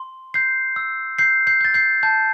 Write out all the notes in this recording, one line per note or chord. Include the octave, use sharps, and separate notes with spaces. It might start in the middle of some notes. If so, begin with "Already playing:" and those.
Already playing: C6
G6 C7
E6
G6 C7
G6 C7
G6 A6
G6 C7
A5 G6